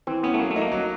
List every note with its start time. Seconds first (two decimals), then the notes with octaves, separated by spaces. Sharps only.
0.07 E3 C4
0.24 B3 C#4
0.34 A3
0.39 F#3 A#3
0.51 A3
0.56 D#4
0.62 A#3
0.72 F#3